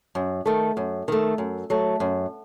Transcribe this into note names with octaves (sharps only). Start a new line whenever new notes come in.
F#2
D#3 A3
F#2
D#3 A3
F#2
F#3 A3
F#2